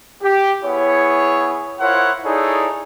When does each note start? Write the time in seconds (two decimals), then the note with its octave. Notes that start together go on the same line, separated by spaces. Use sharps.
0.23 G4
0.64 B3 E4 G#4 C#5
1.80 E4 F4 A#4 C5 C#5 F#5
2.25 D#4 E4 G#4 A4 C#5 D5